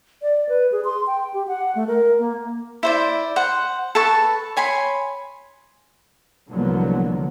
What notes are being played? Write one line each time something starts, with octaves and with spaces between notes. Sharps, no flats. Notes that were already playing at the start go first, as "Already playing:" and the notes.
D5
B4
G#4
C6
G5
G4
F#5
A3
A#4
A#3
E4 C5 D5
C5 F#5
A4 B4 A5 C#6
C#5 G#5 B5 C6
C2 D3 F3 F#3 A#3 B3